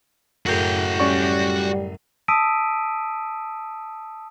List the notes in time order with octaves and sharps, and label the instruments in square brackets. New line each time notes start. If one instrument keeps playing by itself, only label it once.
[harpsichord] F#2 A2 C#3 [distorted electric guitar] F#4 G5
[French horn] G3 [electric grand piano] C#4 D5 C#6
[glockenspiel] A5 D#6 E6 B6 D7 D#7